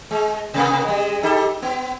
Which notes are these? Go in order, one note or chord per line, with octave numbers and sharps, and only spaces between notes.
G#3
C3 A#3 B3
G3 G#3
D#4 G4 A4
B3